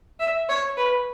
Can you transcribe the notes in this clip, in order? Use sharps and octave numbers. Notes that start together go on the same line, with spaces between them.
E5
C#5
B4